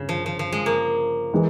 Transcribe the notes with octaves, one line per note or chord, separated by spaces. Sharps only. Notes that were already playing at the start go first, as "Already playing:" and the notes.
Already playing: G1 C#3
F3
F3
F3
G#3
A#3
E3 G#3